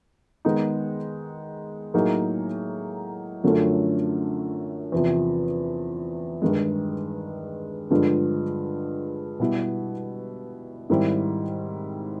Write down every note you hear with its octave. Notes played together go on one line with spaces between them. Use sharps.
D#3 G#3 B3 D#4
A2 F#3 A#3 D#4 G#4
F#2 D3 F3 A3 C#4
E2 C3 F3
G2 D#3 G#3
G2 D3 F3 G#3
B2 G3 B3 E4
G#2 D#3 G3 C4 E4